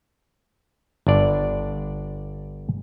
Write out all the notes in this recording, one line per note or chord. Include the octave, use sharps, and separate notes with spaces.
G1 D4 D5